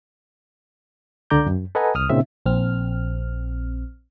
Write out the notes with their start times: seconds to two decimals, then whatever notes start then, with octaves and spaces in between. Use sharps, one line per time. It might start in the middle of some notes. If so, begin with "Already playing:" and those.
1.30 C#2 D3 D5 A#5 D6 G6
1.47 F#2
1.75 A4 B4 D#5 F#5 G#5 A#5
1.95 C2 D#6 F6
2.10 A#2 C#3 C4 D#4 E5
2.46 A#1 C4 F6